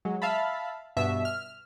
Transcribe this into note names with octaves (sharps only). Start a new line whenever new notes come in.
F#3 G#3
E5 F5 A5 B5
G2 B2 E5
F6